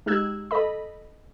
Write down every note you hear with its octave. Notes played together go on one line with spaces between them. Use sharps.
G#3 D#4 G4 E6 F#6 G#6
A4 D#5 B5